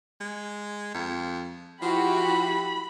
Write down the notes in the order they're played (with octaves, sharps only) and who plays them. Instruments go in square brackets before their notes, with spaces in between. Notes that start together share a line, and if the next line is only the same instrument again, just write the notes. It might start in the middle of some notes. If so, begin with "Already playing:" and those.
[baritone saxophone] G#3
F2
[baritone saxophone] F3 [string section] E4 F#4 G4 [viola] B5